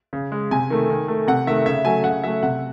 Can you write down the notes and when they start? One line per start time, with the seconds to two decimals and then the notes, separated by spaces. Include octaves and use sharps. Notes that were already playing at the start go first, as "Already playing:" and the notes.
0.13 C#3
0.32 G#3
0.51 C3 G#5
0.70 D#3 A3
0.89 D#3
1.08 A3
1.27 C3 F#5
1.47 D#3 A3 E5
1.66 C#3 E5
1.85 F#3 A3 G#5
2.04 C#3 F#5
2.24 F#3 A3 E5
2.43 C3 F#5